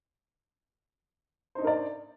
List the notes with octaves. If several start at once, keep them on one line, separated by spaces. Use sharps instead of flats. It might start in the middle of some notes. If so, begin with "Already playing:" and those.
D4 D#4 A#4 C5 D5